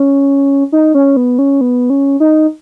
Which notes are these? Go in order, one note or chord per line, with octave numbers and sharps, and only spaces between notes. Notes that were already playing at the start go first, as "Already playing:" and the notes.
Already playing: C#4
D#4
C#4
B3
C#4
B3
C#4
D#4